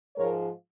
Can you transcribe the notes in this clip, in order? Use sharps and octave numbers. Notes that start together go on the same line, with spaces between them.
G#2 F3 G#3 A#4 C#5